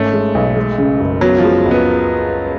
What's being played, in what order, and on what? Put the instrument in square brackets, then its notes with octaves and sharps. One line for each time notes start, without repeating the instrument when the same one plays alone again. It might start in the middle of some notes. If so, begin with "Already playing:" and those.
Already playing: [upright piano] G#1 C#4 [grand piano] A3
[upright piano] G#3
B1
G#3
C#3
F#1
[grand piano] F#3 [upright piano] B3
[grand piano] F3
[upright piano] G#3
C#2
[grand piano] B3